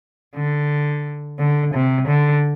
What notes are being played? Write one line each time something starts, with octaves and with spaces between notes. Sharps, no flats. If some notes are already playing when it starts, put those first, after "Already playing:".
D3
D3
C3
D3